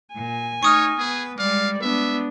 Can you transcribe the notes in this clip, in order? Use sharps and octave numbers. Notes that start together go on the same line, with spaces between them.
A#2 G#5
A3 D#4 C#5 C#6 D#6 F6
B3 G#4 B4
G3 G#3 D5 F5
G#3 B3 D4 E5